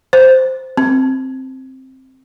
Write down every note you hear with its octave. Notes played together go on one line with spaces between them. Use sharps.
C5
C4